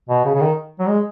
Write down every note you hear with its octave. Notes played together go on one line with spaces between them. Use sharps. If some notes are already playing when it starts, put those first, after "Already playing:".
B2
C#3
C#3
D#3
F#3
G#3